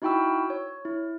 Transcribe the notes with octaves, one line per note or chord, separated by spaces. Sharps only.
D#4 E4 F#4 G5 B5 E6
C#5
E4